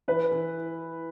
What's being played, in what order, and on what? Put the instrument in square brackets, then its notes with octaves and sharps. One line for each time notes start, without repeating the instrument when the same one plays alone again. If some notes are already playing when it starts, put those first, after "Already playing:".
[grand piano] E3 [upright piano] B4
[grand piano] E3